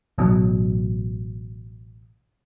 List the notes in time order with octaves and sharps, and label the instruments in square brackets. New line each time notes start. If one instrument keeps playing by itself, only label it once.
[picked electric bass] A1 B2 F#3